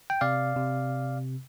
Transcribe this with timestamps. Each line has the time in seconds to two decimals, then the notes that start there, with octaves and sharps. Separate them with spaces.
0.10 G5
0.21 C3 D5 F5
0.56 C3